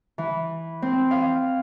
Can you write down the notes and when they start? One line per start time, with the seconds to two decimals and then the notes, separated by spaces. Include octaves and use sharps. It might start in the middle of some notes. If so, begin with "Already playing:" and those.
0.18 E3
0.82 C4
1.11 F5